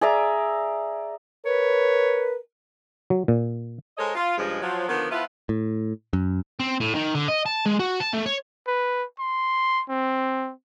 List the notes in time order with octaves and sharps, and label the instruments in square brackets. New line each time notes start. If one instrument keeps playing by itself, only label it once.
[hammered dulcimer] G#4 D5 E5 A#5
[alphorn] A#4 [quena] B4 [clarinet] C#5
[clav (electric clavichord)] F#3
A#2
[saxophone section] G#3 A4 A#4 C5 C#5 D#5
F4
G2 C#3 F3 G#3
F3 F#3
D3 D#3 F3 A#3 B3
F3 B3 E4 F4 B4
[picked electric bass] A2
F#2
[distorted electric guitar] C4
A2
D#3
D3
D#5
A5
G#3
F#4
A5
A3
C#5
[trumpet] B4
C6
C4